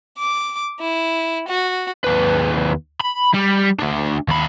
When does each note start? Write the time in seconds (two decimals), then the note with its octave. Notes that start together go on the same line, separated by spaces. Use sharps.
0.18 D6
0.81 E4
1.48 F#4
2.04 D#2 B4
3.01 B5
3.34 G3
3.80 A3 D4
4.28 D#2 B5